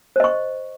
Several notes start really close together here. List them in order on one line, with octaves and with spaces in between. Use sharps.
C5 D#5 C#6